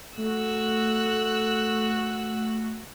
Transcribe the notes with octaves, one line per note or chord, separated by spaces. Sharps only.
A3 F#4 A4 E6 F#6